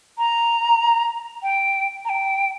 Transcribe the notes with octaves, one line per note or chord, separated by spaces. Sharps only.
A#5
G5
A#5
G5